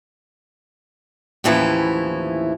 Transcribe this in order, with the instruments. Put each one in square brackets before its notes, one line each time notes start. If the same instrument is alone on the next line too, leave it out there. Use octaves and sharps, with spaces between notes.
[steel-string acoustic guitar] D#2 A2 E3 F3 C#4 E4